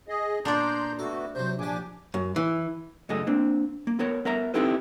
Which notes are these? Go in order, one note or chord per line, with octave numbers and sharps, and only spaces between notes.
G#4 D#5
A#2 B3 D4 D5 A#5 C6 G6
A3 B3 F#4 A4
C3 F#3 C5 G6
A#1 D4 G4 G#5 D6
F#2
E3
C#2 F#2 A3 G#4 D#5
A#3 C4 D4
A#3
B3 A#4 C#5
B3 A#4 E5 A#5
C4 D#4 E4 G4 A4 B4